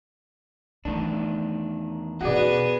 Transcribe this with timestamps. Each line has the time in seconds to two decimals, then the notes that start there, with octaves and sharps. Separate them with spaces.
0.85 E2 D#3 A3 D4
2.21 B2 B3 C#4 F#4 G#4 D5